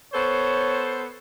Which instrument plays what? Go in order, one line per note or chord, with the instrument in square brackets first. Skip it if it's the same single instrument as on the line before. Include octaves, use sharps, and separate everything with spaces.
[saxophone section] B3 A4 C5 [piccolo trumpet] C#5